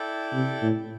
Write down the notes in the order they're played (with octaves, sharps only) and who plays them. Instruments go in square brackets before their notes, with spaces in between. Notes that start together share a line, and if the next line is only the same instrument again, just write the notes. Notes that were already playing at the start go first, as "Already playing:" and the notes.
Already playing: [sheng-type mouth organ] E4 A4 D5 G5
[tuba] C3
A2